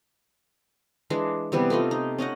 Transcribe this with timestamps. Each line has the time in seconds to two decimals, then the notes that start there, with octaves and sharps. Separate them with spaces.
1.10 E3 G#3 D4
1.52 C3 E3 G3 B3
1.70 A3 D#4 F4 D#5
1.91 D#4
2.18 C#4 D#4 D#5 F#5